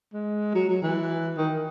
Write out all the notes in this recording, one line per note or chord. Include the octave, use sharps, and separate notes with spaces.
G#3
F#3
F#3
E3
D#3